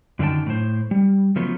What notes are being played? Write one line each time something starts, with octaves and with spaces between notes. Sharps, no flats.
F#2 D3 D#3 F#4 G5 A5
A2 C5
G3
C#3 F3 F#3 A3 B3 C#4